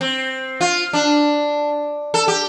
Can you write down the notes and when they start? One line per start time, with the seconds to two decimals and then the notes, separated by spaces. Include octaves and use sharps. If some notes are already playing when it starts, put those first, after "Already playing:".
0.01 C4
0.61 F4
0.93 D4
2.14 A4
2.28 G4